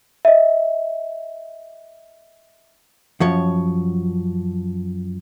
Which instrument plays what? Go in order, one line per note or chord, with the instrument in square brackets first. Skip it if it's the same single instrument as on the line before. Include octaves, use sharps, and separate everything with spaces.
[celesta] D#5 E5
[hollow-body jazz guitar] F#2 F3 C#5